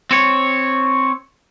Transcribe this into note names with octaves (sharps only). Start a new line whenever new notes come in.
C4 C#5